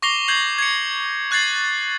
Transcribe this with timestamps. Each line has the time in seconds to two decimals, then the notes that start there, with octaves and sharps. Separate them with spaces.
0.02 C#6 D6 A#6 C7 F7 G7
0.28 G6 G#6 C7 F#7
0.58 G#6 C#7
1.31 C#6 F#6 G#6 A6 C7 F#7